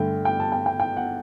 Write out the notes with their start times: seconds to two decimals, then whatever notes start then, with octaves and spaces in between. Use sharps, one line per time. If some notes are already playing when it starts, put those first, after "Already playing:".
Already playing: G2 D3 A3 G5
0.25 G5
0.40 A5
0.52 G5
0.66 G5
0.80 G5
0.97 F#5